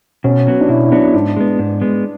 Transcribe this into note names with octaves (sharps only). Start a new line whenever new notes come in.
B2 C#4
F#3 B3 F#4
D4
B2 E4
E4
F#3 B3 D4 F#4
G#2 D4
G#3 B3
G#2
G#3 B3